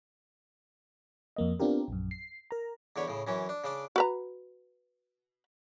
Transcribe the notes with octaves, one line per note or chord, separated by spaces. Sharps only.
F2 A#3 D#5
B3 C4 D4 F4 G4 A#4
A#1 F#2
C7
A#4 A#5
E2 D3 C#5 B5
A2 C#3
F#2 E3 C#4
D4
C#3 D4 D5
F#4 B4 A#5